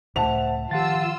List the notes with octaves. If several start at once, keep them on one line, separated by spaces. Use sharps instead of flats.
C#2 A2 A3 C5 E5 F#5 A5 F7
D#3 F3 F4 G4 F#5 E6 A6